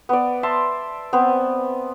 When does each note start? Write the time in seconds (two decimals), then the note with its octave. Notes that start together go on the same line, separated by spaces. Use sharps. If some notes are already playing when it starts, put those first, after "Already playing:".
0.09 B3 D5
0.43 E5 A5 C6
1.13 B3 C4